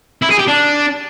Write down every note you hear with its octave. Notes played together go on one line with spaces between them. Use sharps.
E4
G#4
G4
D4